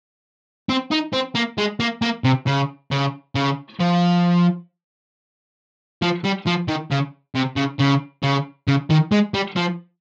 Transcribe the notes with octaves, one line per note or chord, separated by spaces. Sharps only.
C4
D#4
C4
A#3
G#3
A#3
A#3
C3
C#3
C#3
C#3
F3
F3
G3
F3
D#3
C#3
C3
C#3
C#3
C#3
C#3
D#3
G#3
G3
F3